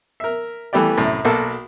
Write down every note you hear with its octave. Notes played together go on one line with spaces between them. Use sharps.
A#4 E5
E3 G3 A3 B3 G4 D5
C2 F#2 A2
B1 A#3 F#4 A4